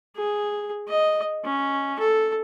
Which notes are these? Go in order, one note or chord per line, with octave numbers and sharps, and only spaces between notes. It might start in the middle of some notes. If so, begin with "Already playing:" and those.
G#4
D#5
C#4
A4